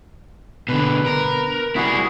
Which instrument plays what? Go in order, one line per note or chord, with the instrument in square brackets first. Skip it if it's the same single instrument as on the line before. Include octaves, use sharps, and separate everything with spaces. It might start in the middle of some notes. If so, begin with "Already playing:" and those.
[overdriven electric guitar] B2 D3 [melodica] B4
[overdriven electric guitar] A#4
[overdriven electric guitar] G3 E4 [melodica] F#4 G#4 F#5